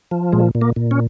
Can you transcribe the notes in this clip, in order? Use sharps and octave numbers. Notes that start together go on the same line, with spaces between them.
F3
A#2 G#3
A#2
A#3
A#2
C#4